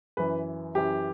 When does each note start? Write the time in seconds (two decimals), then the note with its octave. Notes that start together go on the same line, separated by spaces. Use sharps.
0.17 F#2 E3 B4
0.75 F#2 E3 G4